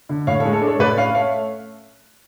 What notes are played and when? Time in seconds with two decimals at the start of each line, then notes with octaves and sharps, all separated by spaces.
0.09 D3
0.27 A2 C#5 F5
0.40 A4 C#5
0.45 G#3
0.53 A4
0.62 D4
0.67 A4 C#5
0.79 A2 B4 D5
0.97 C#4 C#5 F5
1.15 A3 C#5 F5